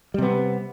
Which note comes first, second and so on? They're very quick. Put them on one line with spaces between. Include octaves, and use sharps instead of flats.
G3 C3 B3